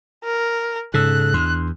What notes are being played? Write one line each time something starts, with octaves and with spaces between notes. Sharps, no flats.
A#4
G#2 C#3 A4 E6 F#6
E2 D4 C6